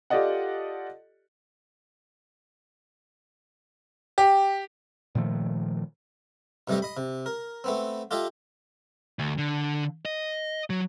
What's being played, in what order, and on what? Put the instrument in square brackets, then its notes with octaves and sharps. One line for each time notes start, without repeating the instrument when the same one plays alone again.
[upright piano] F4 G4 A4 D5 D#5 F#5
[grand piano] G4
[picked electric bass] A#2 D#3 F3 A3
[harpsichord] G2 C3 G3 A3 D#5
D#5 B5
C3
A#4
A3 B3 C4
F4 G4 A4 D#5 E5
[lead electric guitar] D2
D3
D#5
F#3